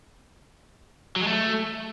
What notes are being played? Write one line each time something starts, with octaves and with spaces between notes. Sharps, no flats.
F#3
G#3
A3